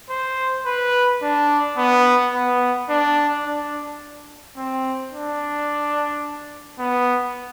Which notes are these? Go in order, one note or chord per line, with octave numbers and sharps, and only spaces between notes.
C5
B4
D4
B3
B3
D4
D4
C4
D4
B3